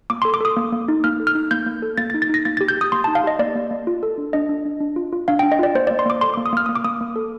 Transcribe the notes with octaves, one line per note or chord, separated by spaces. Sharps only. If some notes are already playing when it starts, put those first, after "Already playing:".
A#3 D6
A4 C6
D6
A4 D#6
A#3
A#3
D#4
A#3 F6
A4
F6
D#4
A#3 G6
A#3
A4
A#3 A6
A6
D#4
A6
D#4 A#6
A#3 A6
G4 A6
G6
G4 D#6
A#3 C6
D#4 A5
F5
G4 D#5
A#3 D5
A#3
A#3
F4
A4
D4
D4 D#5
D4
D4
D4
F4
F4
D4 F5
D4 G5
D#5
F4 D5
A#3 C5
A#3 D5
C6
A#3 D6
A4 C6
A#3 D6
D#6
A#3 F6
A#3 D#6
D6
A#3 D#6
A#3
A4